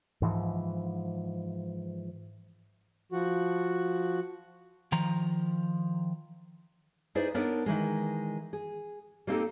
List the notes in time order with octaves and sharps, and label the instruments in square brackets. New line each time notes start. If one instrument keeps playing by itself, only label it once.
[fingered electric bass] G#2 E3 F3
[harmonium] F3 F#4
[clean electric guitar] D#3 F3 A#5
[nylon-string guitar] D#4 E4 G#4 B4 C5 D5
B3 D4 D#4 A#4 C#5
D#3 E3 G#3
G#4
G3 A#3 C4 D#4 G4 A4